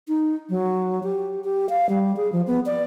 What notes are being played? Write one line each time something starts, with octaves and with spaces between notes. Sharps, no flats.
D#4
F#3
G4
G4
F5
G3
G#4
F3
B3
D5